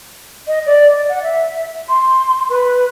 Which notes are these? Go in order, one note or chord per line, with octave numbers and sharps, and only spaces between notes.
D#5
D5
F#5
E5
C6
B4